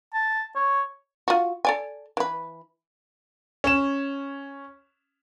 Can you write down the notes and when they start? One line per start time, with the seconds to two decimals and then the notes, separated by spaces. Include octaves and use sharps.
0.13 A5
0.56 C#5
1.28 F4 F#4
1.65 A4 D5 G#5
2.17 E3 B4
3.64 C#4 E7